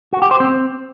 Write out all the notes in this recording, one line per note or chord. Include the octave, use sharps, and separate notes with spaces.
F#4
G4
C5
C4